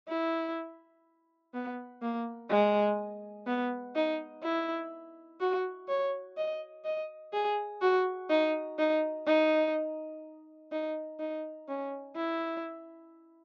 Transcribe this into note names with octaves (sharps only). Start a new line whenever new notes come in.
E4
B3
A#3
G#3
B3
D#4
E4
F#4
C#5
D#5
D#5
G#4
F#4
D#4
D#4
D#4
D#4
D#4
C#4
E4